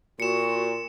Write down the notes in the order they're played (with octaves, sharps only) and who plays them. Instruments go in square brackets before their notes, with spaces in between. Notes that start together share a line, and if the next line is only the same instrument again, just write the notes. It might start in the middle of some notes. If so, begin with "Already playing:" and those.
[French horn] A#2 [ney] F#4 [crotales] C#7 E7